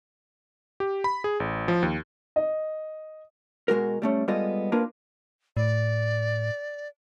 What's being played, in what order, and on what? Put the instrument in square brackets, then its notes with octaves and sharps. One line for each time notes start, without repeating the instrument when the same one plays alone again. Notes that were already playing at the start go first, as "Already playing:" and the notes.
[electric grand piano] G4
B5
G#4
A1
F3
D#2
[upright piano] D#5
[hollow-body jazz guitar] B2 G#3 F#4 A#4
G3 A3 C#4
G3 G#3 B3 F4 A4 D#5
A#3 D4 F4 A#4 B4
[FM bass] A2 [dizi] D5